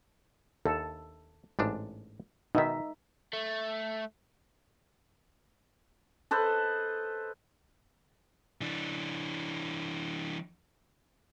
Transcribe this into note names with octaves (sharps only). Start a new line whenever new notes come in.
D#2 A4
A1 G#2 D4
B2 D#3 D#4 E5
A3
A4 B4 C5 D#5
E3 D4